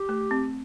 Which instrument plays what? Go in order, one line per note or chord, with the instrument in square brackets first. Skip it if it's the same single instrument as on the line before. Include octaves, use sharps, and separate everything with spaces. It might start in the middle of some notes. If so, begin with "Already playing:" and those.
Already playing: [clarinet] G4
[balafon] A3
C4